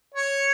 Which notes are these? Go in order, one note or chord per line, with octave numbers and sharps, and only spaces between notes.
C#5